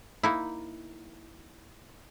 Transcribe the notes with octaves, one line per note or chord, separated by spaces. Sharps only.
A#3 D#4 E4